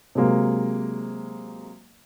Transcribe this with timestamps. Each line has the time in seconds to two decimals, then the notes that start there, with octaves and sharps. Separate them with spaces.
0.15 C3 F#3 G#3 A#3